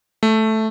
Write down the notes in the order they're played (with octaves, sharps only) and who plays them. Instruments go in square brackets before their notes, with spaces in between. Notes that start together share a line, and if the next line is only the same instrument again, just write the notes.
[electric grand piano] A3